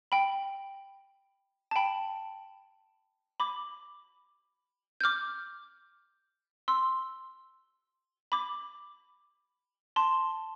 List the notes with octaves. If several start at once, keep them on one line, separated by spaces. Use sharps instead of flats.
G5 B5
A5
G5 B5
B5 D6
G6
D6 F6
C6 E6
B5 D6
A5 C6